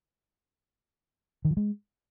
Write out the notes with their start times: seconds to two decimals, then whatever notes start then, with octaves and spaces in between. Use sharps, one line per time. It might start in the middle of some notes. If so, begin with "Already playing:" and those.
1.45 D#3
1.51 F3
1.57 G#3